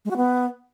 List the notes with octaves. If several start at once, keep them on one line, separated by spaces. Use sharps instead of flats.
G#3
F#4
B3